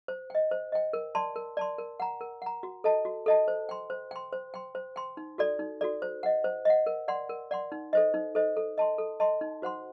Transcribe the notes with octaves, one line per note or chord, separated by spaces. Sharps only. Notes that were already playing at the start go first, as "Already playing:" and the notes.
C5
D#5 G5
C5
D#5 G5
A#4
D5 A5 C6
A#4
D5 A5 C6
A#4
F#5 A#5
A#4
F#5 A#5
F#4
A4 D#5 A5
F#4
A4 D#5 A5
C5
G5 C6
C5
G5 C6
C5
G5 C6
C5
G5 C6
D#4
F#4 A4 D5
D#4
F#4 A4 D5
C5
D#5 F#5
C5
D#5 F#5
A#4
D5 F#5 C6
A#4
D5 F#5 C6
D#4
A4 C5 D#5
D#4
A4 C5 D#5
A4
D#5 A5 C6
A4
D#5 A5 C6
D#4
F#4 C5 F#5 C6